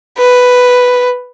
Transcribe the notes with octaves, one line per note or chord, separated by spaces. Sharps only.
B4